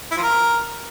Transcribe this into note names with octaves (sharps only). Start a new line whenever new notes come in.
E4
F3
A#4